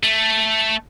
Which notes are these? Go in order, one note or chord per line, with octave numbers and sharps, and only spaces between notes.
A3